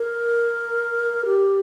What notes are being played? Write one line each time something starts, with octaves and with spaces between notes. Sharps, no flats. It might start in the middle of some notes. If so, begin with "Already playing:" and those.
Already playing: A#4
G4